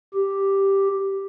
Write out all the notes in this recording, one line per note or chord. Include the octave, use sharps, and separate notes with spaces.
G4